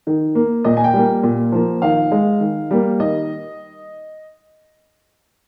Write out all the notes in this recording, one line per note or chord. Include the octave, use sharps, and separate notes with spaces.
D#3
A#3
A#2 D#5
G#5
G5
G3 A#3
A#2
F3 A#3
D#3 F5
G#3
D#3
G3 A#3
D#3 D#5